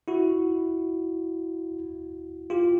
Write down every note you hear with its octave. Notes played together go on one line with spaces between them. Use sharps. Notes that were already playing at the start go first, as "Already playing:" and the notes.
E4 F#4
F4 G4